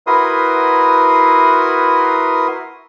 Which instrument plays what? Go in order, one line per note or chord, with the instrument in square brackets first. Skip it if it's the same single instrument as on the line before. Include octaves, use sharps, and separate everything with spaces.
[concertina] E4 F#4 A#4 B4 C6 D#6